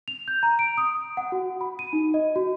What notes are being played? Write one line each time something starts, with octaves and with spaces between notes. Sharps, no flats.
F7
G6
A#5
D7
D#6
F#5
F#4
B5
D#7
D#4
D#5
F#4